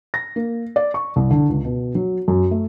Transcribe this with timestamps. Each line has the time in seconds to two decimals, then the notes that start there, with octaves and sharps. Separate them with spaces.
0.14 A#6
0.36 A#3
0.76 D5
0.94 C#6
1.16 C2
1.31 D3
1.49 C#2
1.64 B2
1.95 F#3
2.28 F#2
2.51 A3